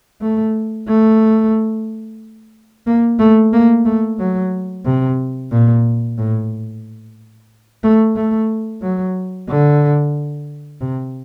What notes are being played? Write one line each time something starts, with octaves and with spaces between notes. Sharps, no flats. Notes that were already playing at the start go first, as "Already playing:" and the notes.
A3
A3
A#3
A3
A#3
A3
F#3
C3
A#2
A2
A3
A3
F#3
D3
C3